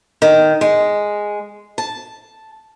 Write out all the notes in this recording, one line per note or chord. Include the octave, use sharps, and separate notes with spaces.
D#3
G#3
A5